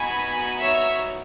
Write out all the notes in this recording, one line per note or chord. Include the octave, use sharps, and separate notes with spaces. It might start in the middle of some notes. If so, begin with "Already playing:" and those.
Already playing: B3 D#4 F#4 G#5 B5
C#5 E5